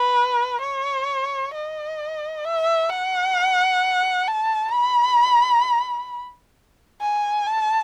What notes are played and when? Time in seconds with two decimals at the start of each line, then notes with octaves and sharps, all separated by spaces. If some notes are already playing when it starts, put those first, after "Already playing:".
Already playing: B4
0.61 C#5
1.54 D#5
2.45 E5
2.90 F#5
4.28 A5
4.73 B5
7.01 G#5
7.47 A5